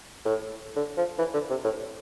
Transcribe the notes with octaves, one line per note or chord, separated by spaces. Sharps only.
A2
D3
F3
E3
D3
C3
A2